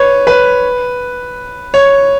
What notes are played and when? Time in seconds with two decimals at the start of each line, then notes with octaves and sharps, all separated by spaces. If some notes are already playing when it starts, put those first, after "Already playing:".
Already playing: B4 C#5
0.27 B4
1.74 C#5